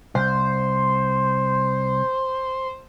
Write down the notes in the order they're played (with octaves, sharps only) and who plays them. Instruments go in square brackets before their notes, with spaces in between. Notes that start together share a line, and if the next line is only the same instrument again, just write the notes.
[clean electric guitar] C2 [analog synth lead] C5